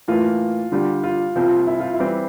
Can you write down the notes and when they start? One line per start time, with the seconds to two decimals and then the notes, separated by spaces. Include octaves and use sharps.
0.08 A2 E3 A#3 F4
0.72 D3 G3 D4 F4 G4
1.04 F4
1.35 C2 A#2 F3 C4
1.67 E4
1.80 F4
1.93 E4
1.99 E3 G3 C4 G4